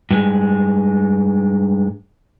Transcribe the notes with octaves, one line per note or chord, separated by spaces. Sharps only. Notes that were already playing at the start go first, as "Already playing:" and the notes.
G2 G#3